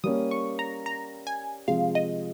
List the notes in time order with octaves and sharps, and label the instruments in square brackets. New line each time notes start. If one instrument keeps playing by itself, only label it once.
[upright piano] G3 A#3 C#4 [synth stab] D#6
[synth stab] C#6
A#5
A#5
G#5
[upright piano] C3 F3 G#3 [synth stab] F5
[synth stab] D#5